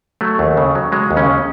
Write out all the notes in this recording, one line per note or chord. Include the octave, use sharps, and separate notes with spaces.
F#3 A3
D#2
C#3
F#3
F#3 G#3
D#2
C#3 C#4